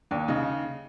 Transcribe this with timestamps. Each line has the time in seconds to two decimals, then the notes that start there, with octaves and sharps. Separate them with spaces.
0.11 D#2 D4
0.28 C#3 D#4